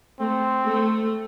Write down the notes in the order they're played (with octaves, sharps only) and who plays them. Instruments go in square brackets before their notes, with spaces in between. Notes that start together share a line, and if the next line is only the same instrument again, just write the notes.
[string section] A3 [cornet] C4
[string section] A3